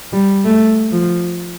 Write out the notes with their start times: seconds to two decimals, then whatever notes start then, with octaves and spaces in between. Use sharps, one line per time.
0.13 G3
0.45 A3
0.92 F3